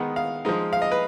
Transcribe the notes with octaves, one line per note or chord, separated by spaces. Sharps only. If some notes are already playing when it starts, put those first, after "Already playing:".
Already playing: D#3 G#3 B3 D#4 F#5
F5
F3 G#3 D#4
F5
D#5
B4